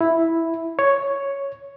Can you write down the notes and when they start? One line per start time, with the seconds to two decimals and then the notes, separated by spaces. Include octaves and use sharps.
0.01 E4
0.79 C#5